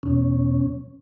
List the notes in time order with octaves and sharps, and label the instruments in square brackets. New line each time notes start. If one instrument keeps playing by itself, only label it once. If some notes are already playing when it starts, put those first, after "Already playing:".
[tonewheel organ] E2 B2 C#4